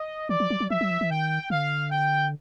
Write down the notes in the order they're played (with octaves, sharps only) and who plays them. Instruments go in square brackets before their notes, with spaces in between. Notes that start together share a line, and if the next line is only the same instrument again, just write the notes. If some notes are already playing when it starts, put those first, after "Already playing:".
Already playing: [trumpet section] D#5
[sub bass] E3 [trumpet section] D5
[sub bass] F3
F#3
F#3
[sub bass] F3 [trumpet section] E5
[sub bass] F#3
F3
E3
[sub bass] D#3 [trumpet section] G5
[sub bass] D3 [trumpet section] F5
[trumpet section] G5